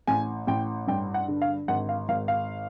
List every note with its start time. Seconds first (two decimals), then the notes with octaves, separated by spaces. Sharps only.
0.07 A1 G#5
0.47 A1 G5
0.87 G2 G5
1.14 F#5
1.28 D3
1.42 F5
1.68 G#1 F#5
1.89 F5
2.09 G#1 F5
2.28 F5